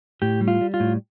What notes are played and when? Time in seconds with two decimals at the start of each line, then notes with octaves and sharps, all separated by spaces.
0.22 A2 G4
0.41 G3
0.48 F4
0.61 G3
0.74 F4
0.80 A2